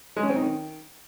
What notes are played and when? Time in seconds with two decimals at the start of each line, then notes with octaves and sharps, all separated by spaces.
0.17 G#3
0.23 C#4
0.29 C4
0.36 D#4
0.42 D#3